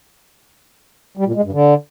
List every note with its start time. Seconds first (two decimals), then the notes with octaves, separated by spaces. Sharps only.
1.17 G3
1.26 A#2
1.35 G#3
1.44 G2
1.53 D3